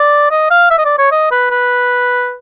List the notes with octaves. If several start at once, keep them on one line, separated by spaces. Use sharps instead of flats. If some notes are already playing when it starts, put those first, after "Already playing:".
Already playing: D5
D#5
F5
E5
D#5
D5
C#5
D#5
B4
B4